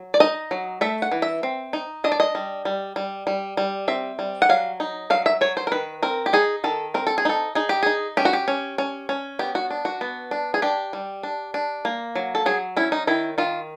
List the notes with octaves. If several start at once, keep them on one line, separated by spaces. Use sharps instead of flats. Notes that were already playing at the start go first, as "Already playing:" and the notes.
Already playing: F#3
D5
D#4 D#5
F#3
A3 E5
F#5
E3
E5
C4
D#4
D4 D#5
D5
D#5
G3
G3
G3
G3
G3
C4 E5
G3
F#5
F#3 F5
D#4
F#3 F5
E5
F#3 C#5
C5
A#4
D#3 B4
C4 A#4
G4
D#4 G#4
D#3 A4
C4 A#4
A4
G#4
D#4 A4
D#4 G#4
G4
D#4 G#4
C#4 G4
F#4
G4
C#4
C#4
C#4
B3 G4
F#4
D4
F#4
B3
D4
G#4
D4 G4
G3
D4
D4
A#3
F#3
A4
F#3 G#4
C#4 E4
D#4
D#3 E4
D#3 F4